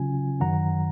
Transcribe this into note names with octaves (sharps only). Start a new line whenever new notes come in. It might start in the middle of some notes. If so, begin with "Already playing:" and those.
Already playing: C#3 F#3 C#4 F4 G#5
F#2 D#3 F#3 F#5 A#5